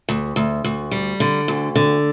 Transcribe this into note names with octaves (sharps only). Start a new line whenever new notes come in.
D2
D2
D2
G3
D3
D2
D3